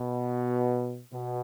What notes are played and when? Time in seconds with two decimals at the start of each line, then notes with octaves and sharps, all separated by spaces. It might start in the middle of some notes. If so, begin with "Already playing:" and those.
Already playing: B2
1.12 B2